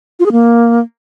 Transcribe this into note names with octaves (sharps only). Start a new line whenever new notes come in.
F4
G#4
A#3